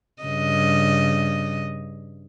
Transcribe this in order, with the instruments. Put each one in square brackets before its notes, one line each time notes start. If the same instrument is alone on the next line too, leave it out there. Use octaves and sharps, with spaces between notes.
[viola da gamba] G2 C#3 D#5